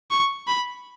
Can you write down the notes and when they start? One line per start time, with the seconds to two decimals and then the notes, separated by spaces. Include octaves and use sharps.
0.11 C#6
0.47 B5